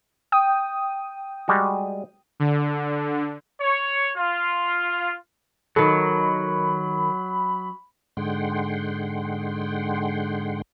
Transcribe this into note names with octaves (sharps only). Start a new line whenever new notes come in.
G5 D#6
G3 G#3 F#4
D3
C#5
F4
D#3 F#3 A4 B5
G#2 D3 G#3 F#5 G5 C6